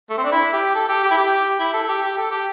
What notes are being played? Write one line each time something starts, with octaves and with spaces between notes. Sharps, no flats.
A3
C4
D4
E4
G4
A4
G4
G4
E4
G4
E4
A4
A4
G4
G4
A4
G4